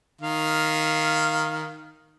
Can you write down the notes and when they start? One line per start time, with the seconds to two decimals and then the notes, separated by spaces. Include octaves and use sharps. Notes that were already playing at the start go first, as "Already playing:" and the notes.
0.21 D#3 F5